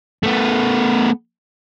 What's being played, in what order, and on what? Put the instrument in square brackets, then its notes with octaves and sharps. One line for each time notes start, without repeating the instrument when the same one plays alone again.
[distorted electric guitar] A3 B3